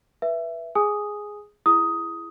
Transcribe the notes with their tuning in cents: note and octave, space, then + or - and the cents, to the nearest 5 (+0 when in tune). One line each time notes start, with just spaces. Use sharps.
B4 -15 E5 +10
G#4 +0 G#5 +0 D#6 +0
E4 +25 G#4 +10 D#6 +10